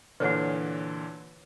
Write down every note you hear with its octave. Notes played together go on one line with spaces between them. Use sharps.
A#2 D3 E3 B4 C#5 F#5